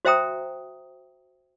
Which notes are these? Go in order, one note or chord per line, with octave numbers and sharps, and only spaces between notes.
F#4 C5 E5 G5 A#5 D#6